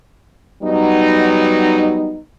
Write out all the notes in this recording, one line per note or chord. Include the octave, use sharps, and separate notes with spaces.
F#3 G3 B3 D#4